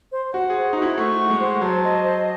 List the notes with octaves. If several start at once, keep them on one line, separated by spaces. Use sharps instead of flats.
C5
F#4 F#5
G#4
C5
D#4
F#4
E4
A3 C#6
F#5
G#3
C5
F#3 A5
D#5
C5